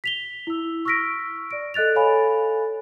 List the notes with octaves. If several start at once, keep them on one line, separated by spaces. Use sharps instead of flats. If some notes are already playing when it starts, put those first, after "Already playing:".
B6 F7 G7
E4 E6
C#6 E6 F6 A#6 B6 D7
D5 D7
A4 D#5 F#6 A6 F7
A4 C#5 F5 G#5 B5